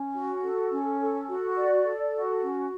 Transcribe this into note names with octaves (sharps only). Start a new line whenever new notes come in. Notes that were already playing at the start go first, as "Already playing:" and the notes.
Already playing: C#4
F#4
A4
C#4
A4
F#4
D5
A4
F#4
C#4